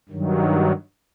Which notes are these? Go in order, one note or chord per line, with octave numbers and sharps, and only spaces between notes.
G2 D#3 F#3